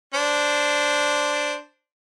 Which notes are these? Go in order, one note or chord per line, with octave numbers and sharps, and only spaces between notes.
D4 C5